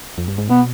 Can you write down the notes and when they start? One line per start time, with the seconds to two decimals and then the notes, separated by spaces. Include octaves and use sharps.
0.18 F2
0.28 G2
0.38 G#2
0.50 B2 B3